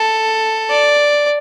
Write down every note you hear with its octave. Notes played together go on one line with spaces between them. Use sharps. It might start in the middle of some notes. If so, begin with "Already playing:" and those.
Already playing: A4
D5